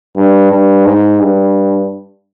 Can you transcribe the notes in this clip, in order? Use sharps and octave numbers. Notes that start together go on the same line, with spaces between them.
G2
G2
G#2
G2